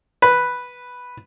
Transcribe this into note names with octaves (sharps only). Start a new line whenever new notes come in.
B4